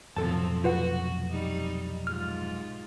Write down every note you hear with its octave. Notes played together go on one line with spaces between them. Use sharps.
B1 F2 A2 C3 F3 C4 A4 A5
F4 F#4 B4 F#5
G3 D#4
G#2 F4 F6